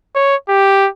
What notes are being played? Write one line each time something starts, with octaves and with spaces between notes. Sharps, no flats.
C#5
G4